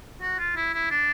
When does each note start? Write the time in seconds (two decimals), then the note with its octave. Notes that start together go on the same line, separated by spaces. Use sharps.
0.22 F#4
0.39 F4
0.56 E4
0.74 E4
0.90 D4